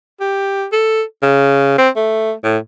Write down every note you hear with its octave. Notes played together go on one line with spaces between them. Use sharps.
G4
A4
C#3
C4
A3
A2